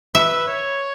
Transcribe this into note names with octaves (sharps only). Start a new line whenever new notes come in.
B4 E5
C#5